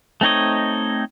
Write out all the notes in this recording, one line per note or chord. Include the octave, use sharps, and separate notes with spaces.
A3 C4 D#4 C#5 D#5